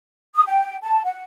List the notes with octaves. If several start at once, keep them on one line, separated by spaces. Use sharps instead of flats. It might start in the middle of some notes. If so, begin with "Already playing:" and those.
D#6
G5
A5
F#5